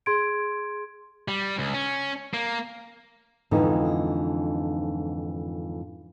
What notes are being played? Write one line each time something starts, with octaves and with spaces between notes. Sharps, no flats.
G#4 C6 G#6 D7
G3
C#2
C#4
A#3
F2 G#2 D3 E3 D#4